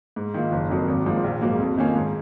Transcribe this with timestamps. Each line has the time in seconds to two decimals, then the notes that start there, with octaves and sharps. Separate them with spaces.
0.16 G#2
0.34 D#3 A#3 F4
0.52 F#1
0.70 F2 D#3 F#3
0.88 G#1
1.06 G#2 F3 A#3
1.24 A#1
1.41 G#2 F#3 A#3
1.59 F2
1.77 D#3 A#3 C#4 F4
1.96 G#2